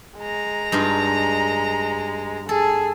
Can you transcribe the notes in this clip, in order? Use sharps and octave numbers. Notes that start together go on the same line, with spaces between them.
G#3 A#5
G2 D#4 F4
G#4 A4